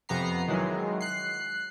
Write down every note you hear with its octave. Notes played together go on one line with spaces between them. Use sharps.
F2 C3 B3 A#5 C7
D#3 E3 F#3 G#3
F#6 C7